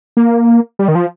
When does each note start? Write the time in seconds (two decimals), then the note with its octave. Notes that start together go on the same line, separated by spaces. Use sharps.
0.17 A#3
0.79 G3
0.88 D#3
0.95 F3